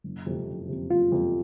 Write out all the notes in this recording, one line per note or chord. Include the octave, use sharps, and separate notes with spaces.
F#1
F2 C3
F#1
F2 C3
F#1 F4
F2 C3